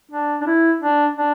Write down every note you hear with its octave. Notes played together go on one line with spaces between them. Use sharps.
D4
D4
E4
D4
D4